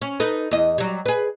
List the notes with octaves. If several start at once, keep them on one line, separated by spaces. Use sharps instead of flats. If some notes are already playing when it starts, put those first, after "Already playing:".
C#4
D#4 A4 B4
E2 D#5
F#3 G3
G#4 B4